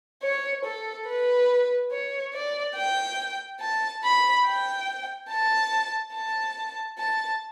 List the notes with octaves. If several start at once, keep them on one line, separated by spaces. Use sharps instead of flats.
C#5
A4
B4
C#5
D5
G5
A5
B5
G5
A5
A5
A5